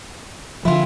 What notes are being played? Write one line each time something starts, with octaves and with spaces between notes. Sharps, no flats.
D3 D#3 F3 E4 F4